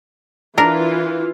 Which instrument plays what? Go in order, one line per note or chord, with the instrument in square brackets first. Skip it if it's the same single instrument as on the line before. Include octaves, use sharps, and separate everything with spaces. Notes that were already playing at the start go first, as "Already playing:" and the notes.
[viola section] E3 F4 [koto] D4 A#4